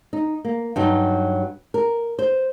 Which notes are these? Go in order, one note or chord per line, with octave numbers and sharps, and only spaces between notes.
D#4
A#3
G2 F#3 D#4
A#4
C5